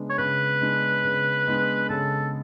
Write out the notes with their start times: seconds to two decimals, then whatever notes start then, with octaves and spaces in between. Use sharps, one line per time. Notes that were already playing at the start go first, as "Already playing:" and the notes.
Already playing: C#3 G#3 B3 D4
0.10 C#5
0.18 C#3 B4
0.61 G#3 B3 D4
1.04 C#3
1.47 G#3 B3 D4
1.89 C#3 A4